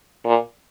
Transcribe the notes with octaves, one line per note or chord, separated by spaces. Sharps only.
A#2